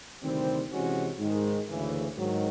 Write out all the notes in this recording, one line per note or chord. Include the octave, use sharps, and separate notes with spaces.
D2 C3 D#3 G3 C4
C3 E3 G#3 C#4 F#4
G#2 D#3 G#3
D2 C#3 E3
G#2 D#3 F#3